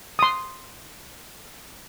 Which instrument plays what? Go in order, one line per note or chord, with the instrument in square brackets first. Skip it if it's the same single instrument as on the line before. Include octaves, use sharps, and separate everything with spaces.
[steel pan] C6 D#6